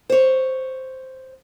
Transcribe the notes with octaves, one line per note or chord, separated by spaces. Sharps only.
C5 C#5